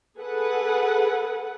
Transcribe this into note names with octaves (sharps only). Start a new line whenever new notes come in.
G#4 A4 B4 F#5